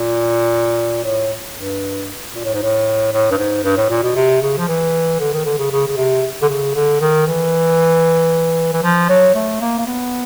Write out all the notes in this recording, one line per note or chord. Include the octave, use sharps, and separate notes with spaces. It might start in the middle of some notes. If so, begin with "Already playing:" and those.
Already playing: A#2
A2
G2
A#2
A2
G#2
A2
A2
G2
G#2
G2
A2
A#2
B2
C3
C#3
F3
E3
D3
D#3
D3
C#3
C#3
C#3
C3
D3
C#3
D3
D#3
E3
E3
F3
F#3
A3
A#3
A#3
B3